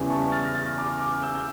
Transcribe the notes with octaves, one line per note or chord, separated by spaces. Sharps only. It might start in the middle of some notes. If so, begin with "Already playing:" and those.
Already playing: E2 C#3 G3 C#4 E4
A5 C#6
F6 A6
A#6
F6 A6
D6 F6
D6 F6
E6 G6
G6